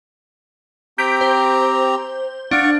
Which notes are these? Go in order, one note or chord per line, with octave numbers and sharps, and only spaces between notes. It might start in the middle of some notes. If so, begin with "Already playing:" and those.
C4 G4 A#5 G6 B6 D7
C5
D4 F5 F#5 C#6